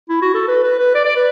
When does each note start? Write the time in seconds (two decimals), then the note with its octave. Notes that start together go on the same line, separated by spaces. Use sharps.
0.09 E4
0.22 F#4
0.34 A4
0.48 B4
0.63 B4
0.79 B4
0.94 D5
1.05 D5
1.16 B4